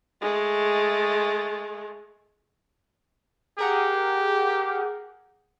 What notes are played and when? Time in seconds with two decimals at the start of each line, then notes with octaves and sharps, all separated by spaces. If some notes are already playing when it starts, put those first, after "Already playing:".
0.21 G#3 A3
3.59 G4 G#4 A#4 F#5